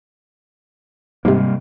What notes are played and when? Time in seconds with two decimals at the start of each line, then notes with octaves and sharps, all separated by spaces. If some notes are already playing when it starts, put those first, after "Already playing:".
1.25 G#2 C3 G3 A#3